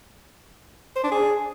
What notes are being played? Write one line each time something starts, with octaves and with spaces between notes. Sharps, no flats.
C5
D4
G#4